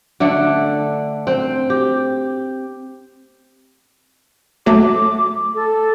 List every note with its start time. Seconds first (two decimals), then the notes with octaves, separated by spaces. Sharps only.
0.20 D3 A3 D4
1.27 C4
1.70 G4
4.66 F#3 A3 D6
5.55 A4